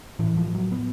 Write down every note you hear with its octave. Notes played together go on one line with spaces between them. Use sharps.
A2 E3
F3
F#3
B3